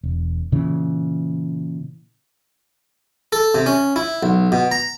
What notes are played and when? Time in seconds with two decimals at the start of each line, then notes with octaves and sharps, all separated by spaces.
0.03 E1
0.52 A#2 C#3 E3
3.33 A4
3.55 C3
3.66 C#4
3.96 E4
4.23 B1
4.52 B2
4.72 A#5